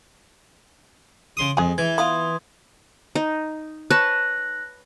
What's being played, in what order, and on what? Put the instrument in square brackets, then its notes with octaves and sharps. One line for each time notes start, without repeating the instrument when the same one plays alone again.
[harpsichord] C#3 C6 D#6
[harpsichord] F2 [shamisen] G#3 G#4
[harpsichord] E3 [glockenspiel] G#6
[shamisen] B3 F4 [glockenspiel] C6 D#6
[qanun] D#4
[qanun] B4 C#5 A5 [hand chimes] F#6 A#6